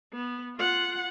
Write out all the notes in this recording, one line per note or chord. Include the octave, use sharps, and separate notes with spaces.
B3
F4 F#5